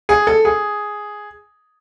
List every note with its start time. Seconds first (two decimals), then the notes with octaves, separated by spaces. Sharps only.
0.09 G#4
0.27 A4
0.45 G#4